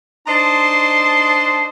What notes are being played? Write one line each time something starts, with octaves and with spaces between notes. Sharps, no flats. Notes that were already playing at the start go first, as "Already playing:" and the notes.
D4 D#4 C5 D#5 A5 C6